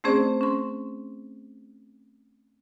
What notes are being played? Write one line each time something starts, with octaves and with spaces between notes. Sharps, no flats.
A3 C4 C#4 G#4 C5 D5
C#4 C6